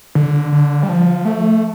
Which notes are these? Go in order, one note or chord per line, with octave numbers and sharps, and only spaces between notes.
D3
D3
G3
F3
A3